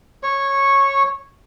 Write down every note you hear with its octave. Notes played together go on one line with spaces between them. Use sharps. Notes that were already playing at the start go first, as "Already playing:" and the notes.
C#5 C#6